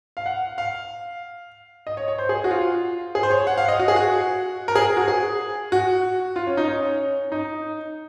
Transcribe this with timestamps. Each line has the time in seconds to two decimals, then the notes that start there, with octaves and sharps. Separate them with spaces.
0.17 F5
0.26 F#5
0.58 F5
1.87 D#5
1.97 C#5
2.08 C#5
2.19 C5
2.29 G#4
2.44 F#4
2.51 F4
3.15 G#4
3.23 C5
3.31 C#5
3.47 F#5
3.58 F5
3.68 D#5
3.79 F#4
3.88 G#4
3.96 F#4
4.68 A#4
4.75 G#4
4.97 F#4
5.08 G#4
5.72 F#4
6.36 F4
6.47 C#4
6.57 D#4
6.68 C#4
7.32 D#4